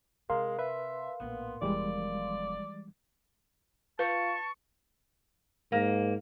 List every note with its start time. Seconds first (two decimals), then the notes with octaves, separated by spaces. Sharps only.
0.30 C3 G#3 A#4 F5 C6
0.59 B4 E5
1.20 A#1 A2 B3
1.62 E1 E3 F3 G3 G#3 D5
3.99 F4 B4 A5 C#6
5.72 G#2 A#3